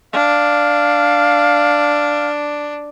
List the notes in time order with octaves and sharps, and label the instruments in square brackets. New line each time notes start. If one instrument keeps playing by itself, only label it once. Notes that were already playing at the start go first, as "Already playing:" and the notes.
[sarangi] D4 [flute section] F5 F6